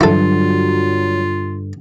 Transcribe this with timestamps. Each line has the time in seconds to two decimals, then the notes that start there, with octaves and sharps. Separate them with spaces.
0.01 G2 D3 F#3 E4 F4 A4